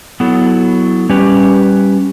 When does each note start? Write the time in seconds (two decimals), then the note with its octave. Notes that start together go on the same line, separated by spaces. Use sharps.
0.20 F#3 B3 E4 A4
1.09 G3 C#4 G4 B4